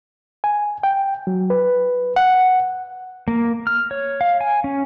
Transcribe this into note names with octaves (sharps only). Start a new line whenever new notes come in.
G#5
G5
F#3
B4
F#5
A#3
F6
C#5
F5
G#5
C#4